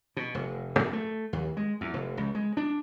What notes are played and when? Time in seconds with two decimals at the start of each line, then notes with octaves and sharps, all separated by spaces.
0.17 B2
0.35 F1
0.79 F#2
0.93 A3
1.33 D#2
1.57 G#3
1.81 E2
1.94 F1
2.17 C#2
2.35 G#3
2.57 D4